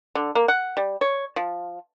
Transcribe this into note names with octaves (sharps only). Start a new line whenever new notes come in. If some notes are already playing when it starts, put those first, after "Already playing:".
D3
A#3
F#5
G3
C#5
F3